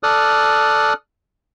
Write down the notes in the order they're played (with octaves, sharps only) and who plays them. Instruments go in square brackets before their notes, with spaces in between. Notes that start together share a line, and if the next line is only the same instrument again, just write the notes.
[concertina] A4 D5 D#6 F6 F#6